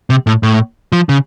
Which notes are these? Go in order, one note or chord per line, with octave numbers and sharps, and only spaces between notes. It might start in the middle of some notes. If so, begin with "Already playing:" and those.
C3
A2
A2
F3
C#3